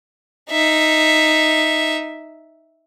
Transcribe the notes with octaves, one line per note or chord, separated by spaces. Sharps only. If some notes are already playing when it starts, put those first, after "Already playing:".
D#4 E5